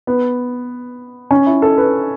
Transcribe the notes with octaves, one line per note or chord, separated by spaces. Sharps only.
B3
C#4
E4
A4
B4